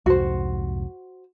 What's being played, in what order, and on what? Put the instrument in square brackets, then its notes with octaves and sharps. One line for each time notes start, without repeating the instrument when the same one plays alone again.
[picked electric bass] C2 F2 G#2 [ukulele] F#4 C5